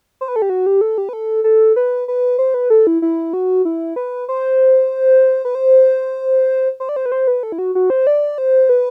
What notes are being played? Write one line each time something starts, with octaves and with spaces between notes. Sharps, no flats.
C5
B4
A4
G4
F#4
G4
A4
G4
B4
A4
A4
B4
B4
C5
B4
A4
E4
E4
F#4
E4
B4
C5
B4
C5
C5
D5
C5
B4
C5
B4
A4
E4
F#4
F#4
C5
D5
C5
B4